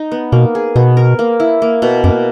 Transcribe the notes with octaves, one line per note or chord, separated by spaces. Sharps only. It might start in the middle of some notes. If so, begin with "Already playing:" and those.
Already playing: D#4
B3
B2 A#3
G#4
B2 B3
A#4
A#3
E4
A#3
B2
F#2 A#3